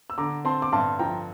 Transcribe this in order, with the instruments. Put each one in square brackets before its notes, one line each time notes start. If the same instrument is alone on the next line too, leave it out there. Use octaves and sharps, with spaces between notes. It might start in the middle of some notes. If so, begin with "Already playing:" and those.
[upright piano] E6
[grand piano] D3 [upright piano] A#5 D6
[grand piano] C4 [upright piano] A5 C6
[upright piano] D6
[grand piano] G2 [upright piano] A5 C6
[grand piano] F3 [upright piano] G5 A#5